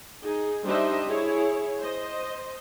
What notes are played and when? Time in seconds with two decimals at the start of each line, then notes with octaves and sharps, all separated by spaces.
0.22 D#4 G#4
0.65 G3 D4 D#4 C5 D#5 E5
1.07 E4 G#4 C#5
1.79 C5 D#5